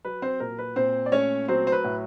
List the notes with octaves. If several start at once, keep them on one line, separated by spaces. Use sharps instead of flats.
F#3 B4
C4 C5
A#2 A#4
B4
A#2 C4 C5
D5
A3 C#4 C#5
F#3 C4 C5
C5
B4
A2